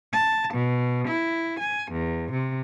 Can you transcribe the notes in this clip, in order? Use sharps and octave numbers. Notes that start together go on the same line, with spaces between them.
A5
B2
E4
G#5
E2
C3